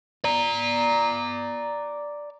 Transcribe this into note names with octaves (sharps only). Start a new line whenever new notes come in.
D5 A#5